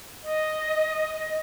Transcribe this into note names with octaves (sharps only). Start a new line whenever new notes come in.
D#5